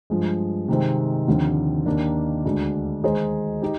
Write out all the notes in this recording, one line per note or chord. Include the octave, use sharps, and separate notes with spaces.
G2 F3 G#3
C3 D#3 G#3 C4
D#2 D3 F3 C4 F4
D#2 D#3 A#3 D4
D2 D3 G#3 D4
D#3 G#3 D#4 G#4 C5
D#4 G4